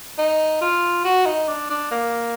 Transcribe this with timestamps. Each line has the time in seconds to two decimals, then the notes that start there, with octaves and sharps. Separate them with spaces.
0.18 D#4
0.61 F4
1.05 F#4
1.26 D#4
1.48 D4
1.70 D4
1.91 A#3